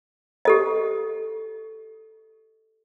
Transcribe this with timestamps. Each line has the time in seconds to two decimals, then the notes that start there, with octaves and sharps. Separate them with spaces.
0.45 G4 A4 D#5